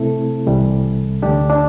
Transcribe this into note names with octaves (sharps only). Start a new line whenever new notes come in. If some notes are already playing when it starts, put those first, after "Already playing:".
Already playing: C3 A3 C4 E4 A4
C2 C3 E3 G3
D2 D3 A3 D4 G4
D4